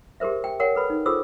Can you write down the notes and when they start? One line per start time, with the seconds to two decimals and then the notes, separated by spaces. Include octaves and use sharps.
0.20 G4 G#4 A#4 C5 E5
0.44 G5
0.60 A#4 C#5 F#5 G5
0.75 A4 B4 B5
0.90 D#4
1.06 F4 G#4 A4 C5 E6